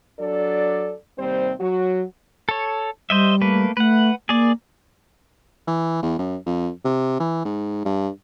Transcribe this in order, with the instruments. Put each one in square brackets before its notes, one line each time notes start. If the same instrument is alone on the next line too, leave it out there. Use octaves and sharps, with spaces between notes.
[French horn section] F#3 D4 A4 D5
D#2 C3 G3 C4 C5
F#3 F#4
[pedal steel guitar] A4 C#5
[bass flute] G3 [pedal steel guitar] C5 D#5 E5
[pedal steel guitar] A3 A#3 B4
[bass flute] A3 [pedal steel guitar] B4 F#5
[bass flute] A#3 [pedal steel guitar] G#4 D5
[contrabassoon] E3
E2
F#2
F2
C3
E3
G#2
G2